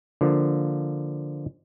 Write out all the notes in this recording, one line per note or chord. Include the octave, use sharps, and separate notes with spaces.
D3 F3 A#3